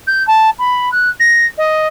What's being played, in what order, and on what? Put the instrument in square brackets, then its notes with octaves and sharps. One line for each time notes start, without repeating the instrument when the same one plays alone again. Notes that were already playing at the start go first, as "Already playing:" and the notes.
[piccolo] G6
A5
B5
F#6
A#6
D#5